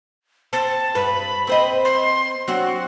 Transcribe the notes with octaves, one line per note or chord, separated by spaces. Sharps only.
C4 A5
G2 B4 B5
C4 C5 D#5
C6
F#3 C4 D4 F#4